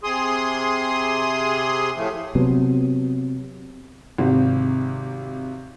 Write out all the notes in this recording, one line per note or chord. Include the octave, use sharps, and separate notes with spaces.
C3 G#4 C6 D#6
A2 F3 A3
C3 F#3 B3
G#1 C3